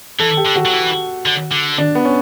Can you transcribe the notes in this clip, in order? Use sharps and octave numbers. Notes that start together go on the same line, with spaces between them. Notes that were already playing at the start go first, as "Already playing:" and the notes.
E3 A4
G4
D3
F#4
F#3
E3
D3
D3
D4
B3
C#4